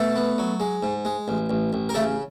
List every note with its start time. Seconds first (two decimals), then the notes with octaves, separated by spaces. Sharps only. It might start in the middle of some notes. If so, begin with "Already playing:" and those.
Already playing: B2 A3 A4
0.16 B3
0.38 F#3
0.60 G#3
0.83 G#2
1.05 G#3
1.28 A1
1.50 A1
1.73 A1
1.89 A#4
1.94 C#3 A3 A4